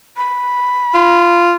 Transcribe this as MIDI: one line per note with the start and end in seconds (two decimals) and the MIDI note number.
0.17 1.46 83
0.94 1.56 65